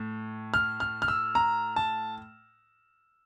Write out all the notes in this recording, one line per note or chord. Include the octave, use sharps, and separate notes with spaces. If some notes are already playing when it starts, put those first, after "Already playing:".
Already playing: A2
F6
F6
F6
E6
A#5
A5